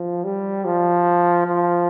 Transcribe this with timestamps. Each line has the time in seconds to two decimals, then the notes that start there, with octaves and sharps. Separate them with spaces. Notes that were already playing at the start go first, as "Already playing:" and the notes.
Already playing: F3
0.24 G3
0.65 F3
1.46 F3